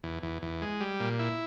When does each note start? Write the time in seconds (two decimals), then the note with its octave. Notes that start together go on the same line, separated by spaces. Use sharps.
0.04 E2
0.23 E2
0.42 E2
0.62 G#3
0.81 G3
1.00 A#2
1.19 E4